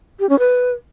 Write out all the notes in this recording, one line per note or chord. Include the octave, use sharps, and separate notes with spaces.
G4
C#4
B4